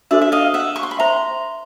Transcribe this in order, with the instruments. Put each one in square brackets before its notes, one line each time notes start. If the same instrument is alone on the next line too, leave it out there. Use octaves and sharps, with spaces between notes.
[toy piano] D4 F#4 A4 C5 [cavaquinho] D5 E5
[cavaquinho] E5
D#5 F5
E5 F#5
C#6
C6
B5
[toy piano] C5 E5 G5 [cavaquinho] A#5 C6